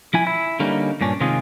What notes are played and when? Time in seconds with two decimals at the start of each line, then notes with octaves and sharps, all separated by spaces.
0.13 F3 E4 G#5
0.27 E4
0.60 D3 G3 A#3 C#4 D#4
1.01 G2 A#2 C#4 D4
1.20 C3 D#3 G#3 C#4 F4 G#4